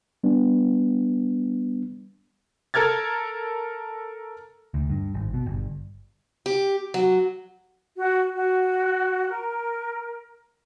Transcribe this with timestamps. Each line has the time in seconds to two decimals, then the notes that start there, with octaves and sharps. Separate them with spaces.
0.24 G3 B3 D4
2.74 A4 A#4 F6 G#6 A6
4.74 D2
4.89 G2
5.14 G#1
5.34 B2
5.46 G1
6.46 G4
6.94 F#3
7.96 F#4
8.33 F#4
9.30 A#4